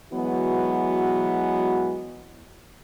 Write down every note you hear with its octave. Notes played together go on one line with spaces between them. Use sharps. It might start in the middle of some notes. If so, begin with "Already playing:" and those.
E3 F#3 G#3 B3 F#4